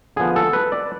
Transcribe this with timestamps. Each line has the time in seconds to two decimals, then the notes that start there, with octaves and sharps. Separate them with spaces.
0.16 D3 F3 B3 G#4
0.36 A4
0.53 B4
0.72 D5